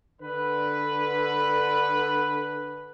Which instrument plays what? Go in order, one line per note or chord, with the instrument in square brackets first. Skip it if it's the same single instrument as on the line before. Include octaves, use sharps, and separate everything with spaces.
[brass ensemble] D3 B4